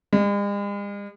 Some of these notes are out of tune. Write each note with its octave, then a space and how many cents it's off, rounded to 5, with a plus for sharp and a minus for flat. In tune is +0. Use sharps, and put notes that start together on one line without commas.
G#3 -45